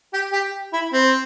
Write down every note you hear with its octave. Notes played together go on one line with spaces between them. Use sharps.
G4
G4
E4
C4